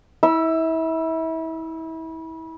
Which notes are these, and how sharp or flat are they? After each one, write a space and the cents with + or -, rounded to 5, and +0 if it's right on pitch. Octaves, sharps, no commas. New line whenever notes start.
E4 -30 E6 +15